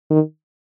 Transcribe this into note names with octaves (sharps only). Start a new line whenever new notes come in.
D#3